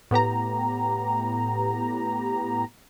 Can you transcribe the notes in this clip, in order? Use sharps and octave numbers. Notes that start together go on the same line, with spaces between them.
A2 B3 G4 A#5